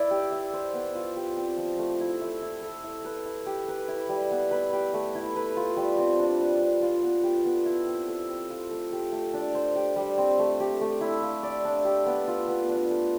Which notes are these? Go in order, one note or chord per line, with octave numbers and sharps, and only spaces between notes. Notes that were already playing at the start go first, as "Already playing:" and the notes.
Already playing: E4 B4 D5
G4
E5
C5
B3
F4
G4
C4
F3
A3
E4
E5
E4
A4
E4
B4
E4
G4
B4
E4
G3
B3
B4
G4
A3
E4
B4
F4
G3
C4
D4
B4
D4
F4
B3
G4
B3
E4
C4
A4
C4
F4
A3
G4
A3
D4
C5
G4
G3
C4
A3
G4
A3
E4
F5
D5
D4
G4
B3
F4
B3
D4
A3